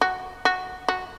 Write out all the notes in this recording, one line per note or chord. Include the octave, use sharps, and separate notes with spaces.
F#4
F#4
F#4